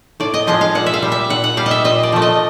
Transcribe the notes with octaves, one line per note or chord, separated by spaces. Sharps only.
A2 D5
D#5
F3 G#3 D#5
F5
A#2 F#5
E5
F5
G3
E5
A#2 F#5
F#5
G3 F5
D#5
E5
A#2 D#5
D5
F3 A3
D#5